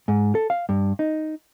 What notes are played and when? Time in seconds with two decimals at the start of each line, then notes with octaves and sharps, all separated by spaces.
0.08 G#2
0.35 A4
0.50 F5
0.69 G2
0.99 D#4